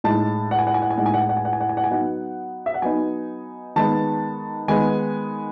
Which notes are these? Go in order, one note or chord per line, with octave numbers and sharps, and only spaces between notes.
A2 G#3 D#4 A5
F#5
G#5
F#5
G#5
F#5
G#5
A2 G#3 D#4 F#5
G#5
F#5
G#5
F#5
G#5
F#5
G#5
F#5
G#5
F#5
G#5
F#3 B3 D#4 F#5
E5
F#5
F#3 B3 D#4 G#5
D#3 G#3 B3 D#4 A5
D#3 G#3 B3 D#4 G#5